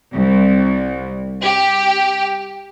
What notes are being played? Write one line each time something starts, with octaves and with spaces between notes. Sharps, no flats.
C2
G4